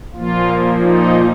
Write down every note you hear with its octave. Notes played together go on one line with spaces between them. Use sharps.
A#2 F3 A#3 F4
D#4